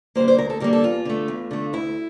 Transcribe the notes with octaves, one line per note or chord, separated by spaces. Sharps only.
D3 G3 A#3 C5
C5
D2 A#4
A4
D3 G3 A#3 A#4
A4
E2 F4
D3 A3
E2
D3 A3
D2 E4